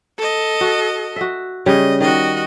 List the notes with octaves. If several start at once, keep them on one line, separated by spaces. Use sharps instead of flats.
A4 D#5
F#4
F#4 E5
C#3 G3 C#5 D#5
D#3 F#4 D#5